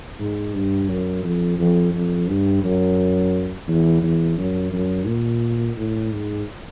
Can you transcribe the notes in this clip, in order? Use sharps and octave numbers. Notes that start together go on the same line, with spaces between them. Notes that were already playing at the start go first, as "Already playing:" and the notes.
G#2
G2
F#2
F2
F2
F2
G2
F#2
E2
E2
F#2
F#2
A#2
A2
G#2